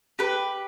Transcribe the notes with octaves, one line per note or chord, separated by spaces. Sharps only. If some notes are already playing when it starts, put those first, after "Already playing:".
G4 B4